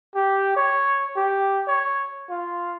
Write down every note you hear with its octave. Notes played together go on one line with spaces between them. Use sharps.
G4
C#5
G4
C#5
F4